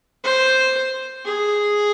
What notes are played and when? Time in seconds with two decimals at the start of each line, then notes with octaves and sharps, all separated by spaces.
0.24 C5
1.26 G#4